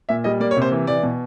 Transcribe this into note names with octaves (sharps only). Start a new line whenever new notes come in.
A#2 E5
G3 D#5
A#3 D5
C#5
C3
C5
E3
E3 D5
B2